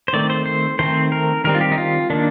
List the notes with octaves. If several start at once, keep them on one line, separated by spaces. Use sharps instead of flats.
C5
D#3 A3 C4 D5
C5
C5
D#3 A3 C4 C5
A#4
D#3 G3 C4 A#4
F4
G4
D#4
F4
D#3 A#3 D4